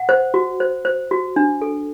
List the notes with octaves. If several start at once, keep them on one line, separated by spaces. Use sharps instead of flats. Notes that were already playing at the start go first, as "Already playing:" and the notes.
Already playing: F#5
C5
F#4
C5
C5
F#4
D4
A4